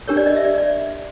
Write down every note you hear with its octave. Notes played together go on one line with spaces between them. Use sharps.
D4 G4 A#4 C#5
D5
D#5
E5
D5
D5